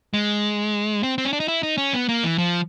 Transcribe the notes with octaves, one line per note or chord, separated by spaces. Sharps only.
G#3
C4
C4
C#4
D4
D#4
E4
D#4
C#4
B3
A#3
E3
F3